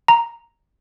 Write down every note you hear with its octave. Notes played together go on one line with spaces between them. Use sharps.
A#5